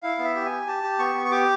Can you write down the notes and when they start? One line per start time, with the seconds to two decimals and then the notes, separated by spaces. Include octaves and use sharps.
0.03 E4 F5
0.19 B3
0.24 E5
0.36 G4
0.45 G#5
0.52 G4
0.67 G4 A5
0.83 G4
0.99 B3 C#6
1.15 B3
1.25 C#6
1.31 G4 D6